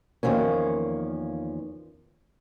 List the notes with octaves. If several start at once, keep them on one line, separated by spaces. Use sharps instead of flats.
E2 D#3 F3 A#3 C#4